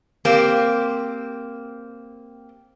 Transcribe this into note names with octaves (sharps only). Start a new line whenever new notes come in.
A#3 C4 G4